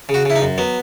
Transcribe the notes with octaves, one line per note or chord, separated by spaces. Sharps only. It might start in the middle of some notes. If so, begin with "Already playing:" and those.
C#3
F#4
C#3 E4
D#4
F#2
F#3 B3